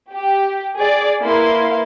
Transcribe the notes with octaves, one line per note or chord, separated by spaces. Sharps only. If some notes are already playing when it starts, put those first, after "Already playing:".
G4
G#4 D5
A#3 E4 B4 F5 C6